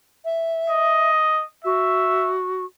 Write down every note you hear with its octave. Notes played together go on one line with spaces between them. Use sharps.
E5
D#5
F#4 E5